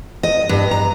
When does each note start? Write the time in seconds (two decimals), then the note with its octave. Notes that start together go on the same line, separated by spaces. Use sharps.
0.23 D#5
0.49 G2
0.71 A#5